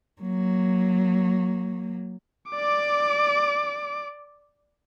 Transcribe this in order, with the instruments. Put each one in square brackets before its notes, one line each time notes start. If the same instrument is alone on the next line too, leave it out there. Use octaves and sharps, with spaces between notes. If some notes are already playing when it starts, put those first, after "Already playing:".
[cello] F#3 A#3
[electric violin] D5 D6